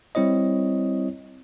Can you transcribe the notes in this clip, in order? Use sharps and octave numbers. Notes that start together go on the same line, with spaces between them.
G3 C4 E4 C#5 D#5